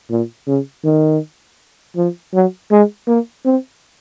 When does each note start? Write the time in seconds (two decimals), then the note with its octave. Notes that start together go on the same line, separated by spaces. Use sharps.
0.10 A#2
0.47 C#3
0.84 D#3
1.96 F3
2.33 F#3
2.71 G#3
3.07 A#3
3.45 C4